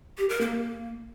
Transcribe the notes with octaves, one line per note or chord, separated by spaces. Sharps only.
G4
A#4
A#3